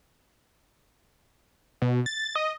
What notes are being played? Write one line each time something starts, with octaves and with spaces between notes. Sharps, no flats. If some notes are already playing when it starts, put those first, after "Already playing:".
B2
A6
D#5